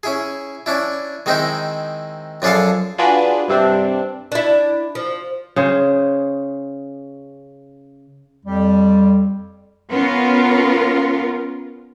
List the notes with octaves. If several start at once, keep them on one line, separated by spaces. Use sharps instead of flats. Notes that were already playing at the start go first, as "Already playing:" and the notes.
C#4 E4 G#4
C#4 D4 E4
D#3 G#3 C4 D#4 E4
F#2 F3 D4 G#4 A4 F5
D4 F4 F#4 G#4 B4 D5
G2 C3 C4 D4
D4 E4
F3
C#3 G#4 C5
F2 G3
B3 C#4 F4 A#4